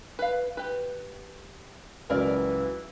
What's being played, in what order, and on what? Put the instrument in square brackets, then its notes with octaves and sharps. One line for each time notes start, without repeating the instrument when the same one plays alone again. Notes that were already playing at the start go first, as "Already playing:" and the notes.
[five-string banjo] B4 F5
G4 B4
[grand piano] C#2 F#3 [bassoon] E3 [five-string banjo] A#4 D5